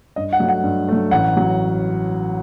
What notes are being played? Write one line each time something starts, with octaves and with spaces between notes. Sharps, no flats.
G2 D#5
F#5
F#3 A3
F#5
G2
F#3 A3
A1 F#5
F#3